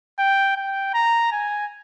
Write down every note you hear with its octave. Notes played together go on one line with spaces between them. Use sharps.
G5
G5
A#5
G#5